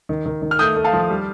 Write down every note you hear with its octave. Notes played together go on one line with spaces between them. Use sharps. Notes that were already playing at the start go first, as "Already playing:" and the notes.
D#3
D#3
D#3
F6
A3 D#6 G6
A3
F5 A5
F3
G3